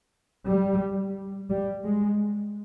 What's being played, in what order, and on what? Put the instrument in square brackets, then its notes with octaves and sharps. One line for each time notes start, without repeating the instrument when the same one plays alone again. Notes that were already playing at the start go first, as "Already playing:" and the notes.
[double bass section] G3
G3
G#3